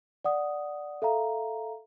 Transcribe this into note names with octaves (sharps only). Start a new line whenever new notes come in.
D5 F#5 D#6
A4 E5 F5 A#5